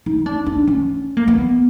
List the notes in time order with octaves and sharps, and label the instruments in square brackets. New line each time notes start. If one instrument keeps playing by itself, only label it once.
[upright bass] D#4
D4
D4
C#4
A#3
B3